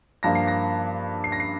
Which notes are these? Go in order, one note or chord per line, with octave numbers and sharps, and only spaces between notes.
G2 F3 A#3 A#6
C7
A#6
C7
A#6
C7